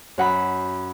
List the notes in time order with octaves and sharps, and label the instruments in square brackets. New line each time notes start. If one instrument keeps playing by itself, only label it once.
[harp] F#2 F#5 B5